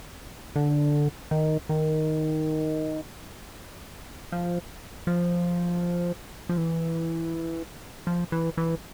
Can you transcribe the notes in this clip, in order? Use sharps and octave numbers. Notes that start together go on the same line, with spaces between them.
D3
D#3
D#3
F3
F3
F3
E3
F3
E3
E3